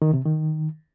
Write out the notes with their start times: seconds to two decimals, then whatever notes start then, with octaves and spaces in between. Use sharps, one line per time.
0.02 D#3
0.14 C3
0.25 D#3